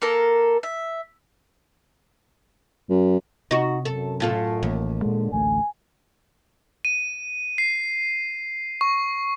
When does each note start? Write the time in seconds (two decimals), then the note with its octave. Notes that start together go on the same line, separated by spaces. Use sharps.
0.02 A#3 A4 A#4
0.63 E5
2.90 F#2
3.51 C3 D#4 F#4
3.85 F#2 A4
4.20 A2 F4 A4
4.63 A1 D#2
5.02 A#2 D3 G#3
5.32 A1 D2 A3 G#5
6.85 D#7
7.58 C7
8.81 C#6